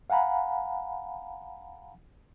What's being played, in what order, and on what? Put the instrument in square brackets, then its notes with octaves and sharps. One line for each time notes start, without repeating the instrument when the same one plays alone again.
[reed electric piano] F5 F#5 G#5 A#5 B5